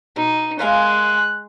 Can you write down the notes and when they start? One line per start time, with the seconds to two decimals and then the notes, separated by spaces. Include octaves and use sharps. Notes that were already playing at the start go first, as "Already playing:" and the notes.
0.16 B2 D#4
0.59 G#3 A#4 F5 G#5 F#6